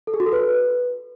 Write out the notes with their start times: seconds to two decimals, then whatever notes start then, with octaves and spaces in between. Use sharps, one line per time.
0.07 A4
0.14 G#4
0.20 F#4
0.26 A4
0.33 B4